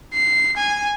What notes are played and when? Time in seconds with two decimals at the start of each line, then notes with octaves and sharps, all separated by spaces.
0.13 C7
0.57 G#5